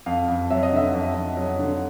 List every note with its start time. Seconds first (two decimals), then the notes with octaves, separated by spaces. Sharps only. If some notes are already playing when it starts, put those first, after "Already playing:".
0.06 F2 F5
0.28 F2
0.50 F#3 E5
0.63 D#5
0.72 D3 E5
0.94 F2
1.15 F2
1.37 F#3
1.59 D3